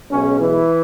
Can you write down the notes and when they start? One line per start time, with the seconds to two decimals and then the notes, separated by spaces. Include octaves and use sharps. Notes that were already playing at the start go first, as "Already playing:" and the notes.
0.11 B1 B2 G#3 C#4
0.40 E3 E4